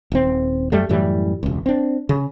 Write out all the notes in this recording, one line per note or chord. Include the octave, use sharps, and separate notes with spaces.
D#1 C4
F#2 G3 A3
F#2 A2 E3 G3
E1 C#2
C4 D4
C#3